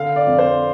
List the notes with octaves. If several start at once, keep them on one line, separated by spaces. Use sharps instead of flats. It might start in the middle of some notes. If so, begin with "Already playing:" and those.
Already playing: D3 F5
D5
F2
C5